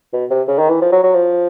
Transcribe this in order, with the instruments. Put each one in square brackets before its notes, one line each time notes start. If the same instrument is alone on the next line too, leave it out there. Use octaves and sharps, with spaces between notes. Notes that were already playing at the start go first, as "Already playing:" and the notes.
[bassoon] B2
C3
C#3
D#3
E3
F3
F#3
F#3
F3